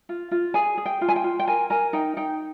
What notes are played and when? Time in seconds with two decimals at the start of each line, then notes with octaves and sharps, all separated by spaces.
0.09 F4
0.31 F4
0.54 G#4 G#5
0.78 G#4
0.86 G5
1.01 F4
1.08 G#5
1.16 G5
1.24 F4
1.39 G5
1.47 A#4 G#5
1.70 A#4 G#5
1.93 D#4 G5
2.17 D#4 G5